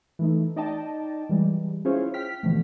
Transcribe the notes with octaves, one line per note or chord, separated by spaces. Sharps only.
E3 A3 D#4
D#4 D5 D#5 G5 A5
E3 G3 G#3
C#4 E4 F4 G#4 C5 C#5
G5 F6 B6
B2 D3 E3 F3 A3